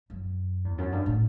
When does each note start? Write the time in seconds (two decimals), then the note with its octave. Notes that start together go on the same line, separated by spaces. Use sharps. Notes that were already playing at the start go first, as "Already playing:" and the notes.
0.10 F#2
0.65 E2
0.78 F#2
0.92 G2
1.06 A2